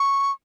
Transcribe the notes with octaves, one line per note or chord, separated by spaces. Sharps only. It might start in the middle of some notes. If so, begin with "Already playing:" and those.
Already playing: C#6